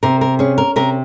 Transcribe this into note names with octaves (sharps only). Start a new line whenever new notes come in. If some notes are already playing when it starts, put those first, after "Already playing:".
C3 A#4
A#4
C#4 G#4
A#4
C3 A#4